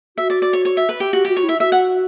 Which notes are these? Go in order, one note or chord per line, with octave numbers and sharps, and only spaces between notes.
F#4 E5
D5
D5
C#5
C#5
E5
B4
G4
F#4 G4
F#4 G4
F#4 C#5
E4 E5
F#4 E5
F#5